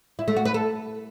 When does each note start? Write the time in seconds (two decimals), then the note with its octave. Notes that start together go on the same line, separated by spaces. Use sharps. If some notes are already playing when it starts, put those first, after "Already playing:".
0.19 E4
0.28 A3
0.36 F#4
0.45 B4
0.54 A4